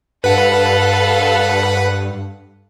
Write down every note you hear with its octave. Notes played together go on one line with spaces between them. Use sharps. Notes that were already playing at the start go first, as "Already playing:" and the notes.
G2 A4 B4 F5 F#5